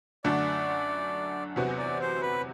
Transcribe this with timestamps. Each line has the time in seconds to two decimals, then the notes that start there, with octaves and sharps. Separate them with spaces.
0.24 F#2 D3 A3 D4 F#4 D5
1.56 E2 C3 F#3 B3 F#4
1.78 D5
2.01 C5
2.22 B4